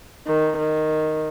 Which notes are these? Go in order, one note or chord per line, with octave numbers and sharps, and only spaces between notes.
D#3
D#3